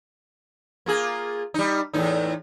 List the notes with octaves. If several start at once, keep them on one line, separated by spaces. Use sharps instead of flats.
A#3 F4 G#4
G3 D#4
E2 A2 D#4